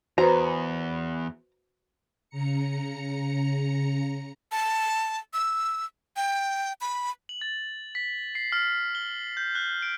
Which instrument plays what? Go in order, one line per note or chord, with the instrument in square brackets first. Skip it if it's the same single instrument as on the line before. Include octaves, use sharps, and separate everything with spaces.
[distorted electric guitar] E2 [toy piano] F#4 [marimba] B4 C5 [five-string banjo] A#5
[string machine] C#3 A#5 C#7
[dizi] A5
E6
G5
B5
[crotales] F#7
A6
B6
C7
F6
G7
G6
F#6
D7